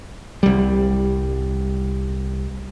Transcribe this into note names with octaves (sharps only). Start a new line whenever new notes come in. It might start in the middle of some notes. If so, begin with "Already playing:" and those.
C2 G3